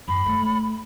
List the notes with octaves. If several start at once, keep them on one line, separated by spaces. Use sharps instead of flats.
F#2 B5
A3